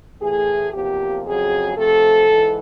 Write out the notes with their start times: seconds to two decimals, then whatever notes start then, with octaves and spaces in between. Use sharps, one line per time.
0.21 A2 E3 A3 G#4
0.73 E2 C3 F3 A#3 G4
1.25 F2 C#3 F#3 G#4
1.77 C3 F3 A3 A4
2.29 G#2 E3